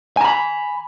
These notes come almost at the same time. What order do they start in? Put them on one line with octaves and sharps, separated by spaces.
G#5 A#5 B5